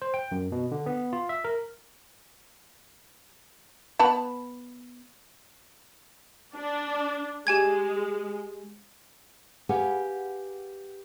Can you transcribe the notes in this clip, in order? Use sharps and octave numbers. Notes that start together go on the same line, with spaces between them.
C5
G5
F#2
B2
D3
B3
F4
E5
A#4
B3 A5 B5
D4
G#3 G4 G#5 G#6
G4 G#4 B4 F5 F#5 G#5